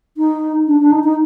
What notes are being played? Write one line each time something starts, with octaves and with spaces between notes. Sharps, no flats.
D#4
D4
D4
D#4
D#4